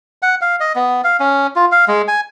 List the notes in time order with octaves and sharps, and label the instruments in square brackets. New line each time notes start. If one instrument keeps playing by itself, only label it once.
[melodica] F#5
F5
D#5
B3
F5
C#4
F4
F5
G#3
G#5